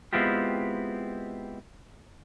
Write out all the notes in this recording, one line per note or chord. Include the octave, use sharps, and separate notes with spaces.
G#3 B3 C4 E4 F4 G4